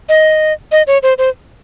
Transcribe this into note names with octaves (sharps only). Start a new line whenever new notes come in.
D#5
D#5
C#5
C5
C5